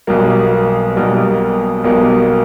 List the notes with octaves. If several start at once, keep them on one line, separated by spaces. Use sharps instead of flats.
B1 B2 G3 A#3
B1 B2 G3 A#3
B1 B2 G3 A#3